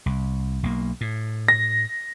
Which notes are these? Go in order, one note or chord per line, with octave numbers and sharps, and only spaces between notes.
C2
B1 A#3
A2
A#6